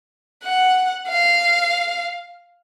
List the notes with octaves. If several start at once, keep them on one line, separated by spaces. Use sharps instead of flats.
F#5
F5